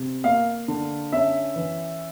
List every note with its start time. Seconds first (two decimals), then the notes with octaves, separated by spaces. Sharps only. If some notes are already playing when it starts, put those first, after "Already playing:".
Already playing: C3
0.24 A#3 F5
0.68 D3
1.12 C#4 E5
1.56 E3